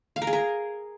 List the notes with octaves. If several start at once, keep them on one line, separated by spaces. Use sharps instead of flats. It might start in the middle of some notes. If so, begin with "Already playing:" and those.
F5
A#4
G#4
A#4